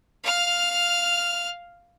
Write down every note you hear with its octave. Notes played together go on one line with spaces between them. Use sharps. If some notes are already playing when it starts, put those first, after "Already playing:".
F5 F6